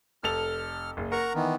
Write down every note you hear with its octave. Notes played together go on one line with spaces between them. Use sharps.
F1 A4 F6 F7
F#1
A#4 F#5 A#5 C#6
D#3 E3 B3